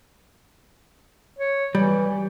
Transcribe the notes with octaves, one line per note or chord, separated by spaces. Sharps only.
C#5
E3 G3